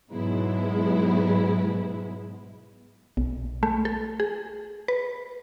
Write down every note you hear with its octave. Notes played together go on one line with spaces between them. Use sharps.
G#2 B2 F#3 G#3 B3 E4
B1
A3
A4
G#4
B4